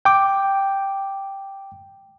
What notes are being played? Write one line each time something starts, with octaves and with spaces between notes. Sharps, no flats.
G5 D6